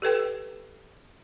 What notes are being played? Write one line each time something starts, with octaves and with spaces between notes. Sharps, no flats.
G4 A4 B4 G5